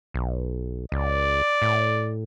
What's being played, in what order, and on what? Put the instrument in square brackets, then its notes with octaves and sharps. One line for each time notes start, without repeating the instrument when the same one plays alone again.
[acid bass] B1
[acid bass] C#2 [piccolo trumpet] D5
[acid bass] A2